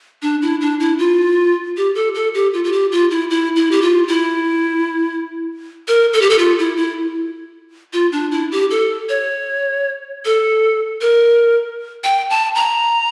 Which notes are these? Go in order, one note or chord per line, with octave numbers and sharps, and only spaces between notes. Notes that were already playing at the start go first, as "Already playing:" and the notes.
D4
E4
D4
E4
F4
G4
A4
A4
G4
F4
F4
G4
F4
E4
E4
E4
G4
F4
E4
A#4
A4
G4
A4
F4
E4
E4
F4
D4
E4
G4
A4
C#5
A4
A#4
G5
A5
A#5